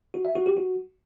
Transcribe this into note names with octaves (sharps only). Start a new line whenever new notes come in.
F#4
E5
F#4
G4
F#4